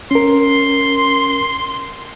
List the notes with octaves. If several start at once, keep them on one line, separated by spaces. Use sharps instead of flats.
C#4 A#4 C6